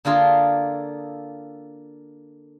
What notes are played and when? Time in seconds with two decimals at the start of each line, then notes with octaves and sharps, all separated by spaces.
0.05 D3 A#3 F4 G#4 A4